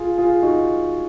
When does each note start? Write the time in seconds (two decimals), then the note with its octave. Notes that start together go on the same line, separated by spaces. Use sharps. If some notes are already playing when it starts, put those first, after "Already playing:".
Already playing: F4 G#4
0.18 F4 G#4
0.43 D#4 F#4